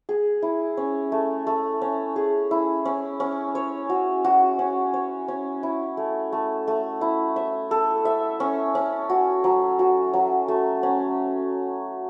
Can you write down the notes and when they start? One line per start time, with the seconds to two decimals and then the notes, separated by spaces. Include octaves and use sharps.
0.09 G#4
0.42 E4
0.77 C#4
1.12 A3
1.47 A3
1.82 C#4
2.16 G#4
2.51 E4
2.85 C#4
3.20 C#4
3.55 C#5
3.89 F#4
4.24 F#4
4.59 C#4
4.94 C#5
5.28 C#4
5.63 E4
5.97 A3
6.32 A3
6.67 A3
7.01 E4
7.36 E5
7.71 A4
8.05 E5
8.40 C#4
8.75 C#4
9.10 F#4
9.44 F#3
9.79 F#4
10.14 F#3
10.48 A3
10.83 C#4